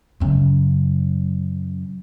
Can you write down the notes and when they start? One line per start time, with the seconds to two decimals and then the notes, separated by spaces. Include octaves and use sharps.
0.20 F#2 C#3